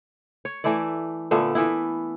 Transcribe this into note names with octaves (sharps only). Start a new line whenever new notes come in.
C#5
E3 A3 E4 D5
A#2 D3 A3 B3
E3 B3 E4